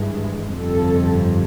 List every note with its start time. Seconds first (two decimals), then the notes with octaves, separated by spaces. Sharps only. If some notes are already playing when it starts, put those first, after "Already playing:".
Already playing: G#1 G2 E3 G#3
0.59 G1 F2 C3 A4